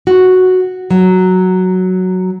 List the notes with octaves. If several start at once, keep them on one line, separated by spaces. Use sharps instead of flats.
F#4
F#3